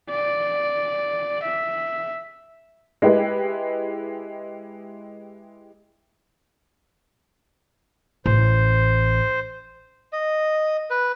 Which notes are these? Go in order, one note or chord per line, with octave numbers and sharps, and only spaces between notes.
D5
E5
G#3 E4 G4 B4
A1 C5
D#5
B4